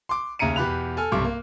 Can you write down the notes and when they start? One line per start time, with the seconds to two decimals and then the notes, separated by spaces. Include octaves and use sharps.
0.09 C6 D6
0.39 D#2 C#3 E5 A#5 C#7 D#7
0.56 E2 B2 G4 B5 F#6 F7
0.97 A4 G#5 F6
1.12 B1 G2 C3 C#6 D6
1.24 A#3